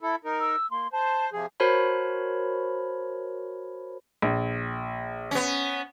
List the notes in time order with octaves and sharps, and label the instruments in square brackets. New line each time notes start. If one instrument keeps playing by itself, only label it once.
[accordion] E4 A4
D#4 A#4
[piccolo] E6
[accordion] A#3 [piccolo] C6
[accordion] C5 [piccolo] A5
[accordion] C3 F3 G#4
[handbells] F#4 A#4 C5 C#5 A5 B5
[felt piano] A#1
[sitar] B3 C#4